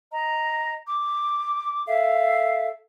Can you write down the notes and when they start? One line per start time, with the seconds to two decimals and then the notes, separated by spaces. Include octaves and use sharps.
0.12 D#5 A#5
0.87 D6
1.86 A4 E5 F5